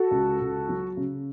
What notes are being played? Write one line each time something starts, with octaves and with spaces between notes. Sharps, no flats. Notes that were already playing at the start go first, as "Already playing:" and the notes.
Already playing: F#4 A4
C#2
C#2
F#3
C#3